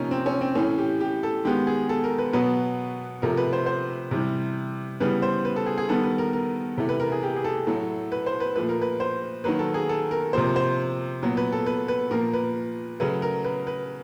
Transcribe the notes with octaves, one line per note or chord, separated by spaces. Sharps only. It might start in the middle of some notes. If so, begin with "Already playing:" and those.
Already playing: C3 F3 A#3 C#4 D#4
C4
C#4
C4
A2 E3 A3 C#4
G4
G4
A4
D#3 G#3 B3 G4
G#4
A4
A#4
B4
B2 F#3 B3 B4
C3 F3 A3 A#4
B4
C5
C5
C3 E3 G3
C#3 E3 G3 B3 B4
C5
B4
A4
G#4
G#4
D#3 G3 B3 A4
B4
A#4
A#4
C3 E3 A3
B4
A#4
G#4
G4
G#4
A4
A2 F#3 A3
B4
C5
B4
A#2 F3 A3 B4
A#4
B4
C5
D#3 F#3 A#3 B4
A4
G#4
A4
A#4
C3 F3 A#3 C5
C5
A#2 F#3 B3
B4
A4
B4
B4
A#2 F3 A#3 A#4
B4
C#3 F#3 A3 B4
A#4
B4
B4